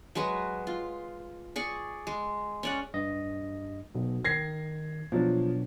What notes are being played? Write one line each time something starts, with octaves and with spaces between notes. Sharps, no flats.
F#3 G#3 G#4 B4
F4
G#4 D5 C#6
G#3
C#4 D5 F#5
G2 D#5
B1 B2
D#3 G#6 A#6 C7
B2 F3 F#3 D4